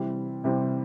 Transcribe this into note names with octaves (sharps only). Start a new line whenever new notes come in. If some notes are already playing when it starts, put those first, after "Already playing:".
Already playing: C3 E3 G3 C4
C3 E3 G3 C4